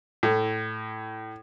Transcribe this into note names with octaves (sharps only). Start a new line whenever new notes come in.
A2